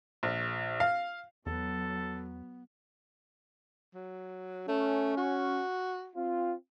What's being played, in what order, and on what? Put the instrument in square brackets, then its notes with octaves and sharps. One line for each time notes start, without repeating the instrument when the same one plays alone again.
[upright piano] A#1
F5
[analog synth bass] E2 [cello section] F#3 [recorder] B3 [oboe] A4
[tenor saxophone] F#3
[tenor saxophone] A3 [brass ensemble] C#4
[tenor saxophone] F#4
[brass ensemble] C4 F4